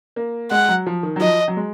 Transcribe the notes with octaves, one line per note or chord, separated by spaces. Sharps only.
A#3
G#3 F#5
F#3
F3
D#3
F#3
F3 D#5
F#3
G#3